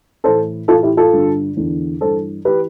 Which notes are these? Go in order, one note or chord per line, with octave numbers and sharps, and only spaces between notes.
A2 E3 A4 C5
A2 E3 F4 A4
E4 G4
F4 A4
G2 D3
E2 D3
G2 E3 A4 C5
E3 G4 B4